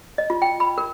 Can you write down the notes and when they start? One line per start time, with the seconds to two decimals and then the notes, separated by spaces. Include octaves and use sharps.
0.18 D#5
0.30 F4
0.42 G5
0.60 B5
0.78 A#4